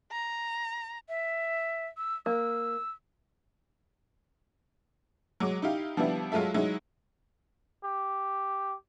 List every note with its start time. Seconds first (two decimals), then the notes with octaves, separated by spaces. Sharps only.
0.12 A#5
1.09 E5
1.97 E6
2.26 A#3 E6
5.40 F#3 G#3 D6
5.62 D#4 E4 G4 F5
5.96 D3 F3 G3 B3 D4 E4
6.32 F#3 G#3 F4 A4 E5
6.54 F#3 G#3 D#4 E4
7.84 G4